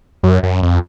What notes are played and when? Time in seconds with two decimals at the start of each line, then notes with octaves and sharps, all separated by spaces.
0.23 F#2
0.43 F#2
0.62 F2